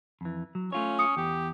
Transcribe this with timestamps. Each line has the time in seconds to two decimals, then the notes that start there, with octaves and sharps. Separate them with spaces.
0.21 F2 E3
0.55 F#3
0.72 A3 C#4 F4 C#5
0.99 D#6 C#7
1.17 E2 G4